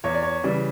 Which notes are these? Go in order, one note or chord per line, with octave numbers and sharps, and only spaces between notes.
E2 C#5
D5
C#5
C#3 E3 G3 D5